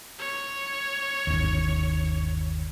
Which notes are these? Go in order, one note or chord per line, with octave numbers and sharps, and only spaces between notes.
C#5
G1 D#2